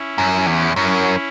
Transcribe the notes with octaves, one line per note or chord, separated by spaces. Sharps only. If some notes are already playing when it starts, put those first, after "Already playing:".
Already playing: C#4 E4
F#2
C#4 E4
E2
F#2 C#4 E4